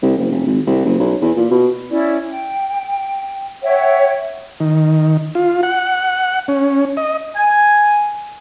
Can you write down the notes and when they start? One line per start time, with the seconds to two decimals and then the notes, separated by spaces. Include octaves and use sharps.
0.02 C2
0.18 F#1
0.31 F1
0.46 G#1
0.67 C2
0.85 F#1
0.99 B1
1.21 E2
1.37 A#2
1.51 B2
1.89 C#4 E4 D5
2.30 G5
3.63 C#5 E5 F#5 G5
4.60 D#3
5.35 F4
5.63 F#5
6.48 C#4
6.97 D#5
7.36 G#5